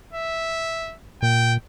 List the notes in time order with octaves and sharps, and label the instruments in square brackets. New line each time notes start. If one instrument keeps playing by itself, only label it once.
[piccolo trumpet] E5
[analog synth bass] A#2 [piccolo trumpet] G5